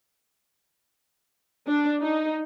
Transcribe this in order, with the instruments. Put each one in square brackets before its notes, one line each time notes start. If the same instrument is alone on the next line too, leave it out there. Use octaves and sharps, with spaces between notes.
[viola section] D4
D#4